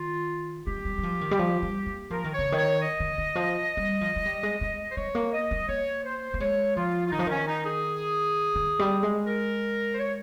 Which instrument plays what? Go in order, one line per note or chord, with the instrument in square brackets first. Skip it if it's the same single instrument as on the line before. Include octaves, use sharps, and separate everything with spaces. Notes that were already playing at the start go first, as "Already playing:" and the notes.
Already playing: [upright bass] D#3 [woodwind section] F4
[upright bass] G#3 [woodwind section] G4
[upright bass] G3
G3
F3
D#3
G3
F3
G3
A#3
[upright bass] F3 [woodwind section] A#4
[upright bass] D#3
[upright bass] C#3 [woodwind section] C#5
[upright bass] D#3
[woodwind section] C#5
D#5
[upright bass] D#3
D#3
F3
G3
F3
G#3
G3
G#3
G#3
[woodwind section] C5
[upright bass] G#3 [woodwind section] C#5
[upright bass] A#3
[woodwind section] D#5
[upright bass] G#3
[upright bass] A#3 [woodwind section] C#5
[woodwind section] C5
[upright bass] A#3
[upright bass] G#3 [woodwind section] C#5
[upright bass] F3 [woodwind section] F4
[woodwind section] F4
[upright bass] D#3 [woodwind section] D#4
[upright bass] F3
[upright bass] D#3 [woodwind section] C#4
[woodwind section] D#4
G#4
[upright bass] D#3
G3
G#3
[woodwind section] A#4
C5
C#5